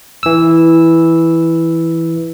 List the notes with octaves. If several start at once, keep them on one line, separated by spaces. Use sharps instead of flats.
E3 E6